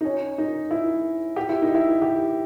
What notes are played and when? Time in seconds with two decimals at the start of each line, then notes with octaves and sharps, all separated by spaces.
0.01 D#4
0.05 C#4
0.38 D#4
0.71 E4
1.36 G4
1.49 E4
1.62 D#4
1.74 E4
2.02 G4